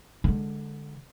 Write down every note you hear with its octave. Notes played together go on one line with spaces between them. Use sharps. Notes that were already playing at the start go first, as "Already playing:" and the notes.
D3 G#3